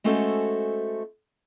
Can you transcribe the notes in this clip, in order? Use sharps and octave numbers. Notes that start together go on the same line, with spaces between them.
G#3 A3 C#4 F#4 A4 C5